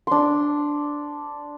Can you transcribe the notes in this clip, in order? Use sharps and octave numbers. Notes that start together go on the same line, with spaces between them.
D4 C6